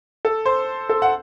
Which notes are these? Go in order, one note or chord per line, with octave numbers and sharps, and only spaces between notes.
A4
C5
A4
F#5